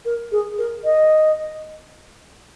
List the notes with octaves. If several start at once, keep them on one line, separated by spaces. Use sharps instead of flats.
A#4
G#4
A#4
D#5